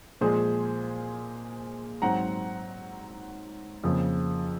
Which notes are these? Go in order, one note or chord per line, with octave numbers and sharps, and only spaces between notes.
A#2 F3 G#3 G#4 C5
G#2 F#3 C4 F#5 A#5
F2 C#3 F3 A#3